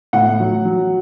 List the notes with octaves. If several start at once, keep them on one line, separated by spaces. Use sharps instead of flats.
A2 F#5
F#3
F#3